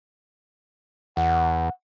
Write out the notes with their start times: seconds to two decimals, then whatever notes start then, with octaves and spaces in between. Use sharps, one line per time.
1.17 E2 F#5